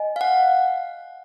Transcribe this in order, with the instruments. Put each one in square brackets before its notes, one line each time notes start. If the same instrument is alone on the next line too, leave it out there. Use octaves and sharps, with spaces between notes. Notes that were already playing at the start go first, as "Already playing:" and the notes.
Already playing: [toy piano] D#5 G#5
[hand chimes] F5
F#5